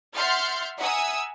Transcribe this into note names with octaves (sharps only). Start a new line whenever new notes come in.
E5 F#5 C6 F6 G6 A6
E5 F#5 G#5 A#5 D#6 E6